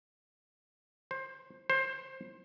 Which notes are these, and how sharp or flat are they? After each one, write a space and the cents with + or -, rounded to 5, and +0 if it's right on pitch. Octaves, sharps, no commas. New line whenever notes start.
C5 +20
C5 +20